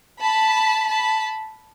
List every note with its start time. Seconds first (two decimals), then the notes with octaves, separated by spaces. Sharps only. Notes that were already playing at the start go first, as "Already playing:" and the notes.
0.21 A5 B5
0.90 A5 B5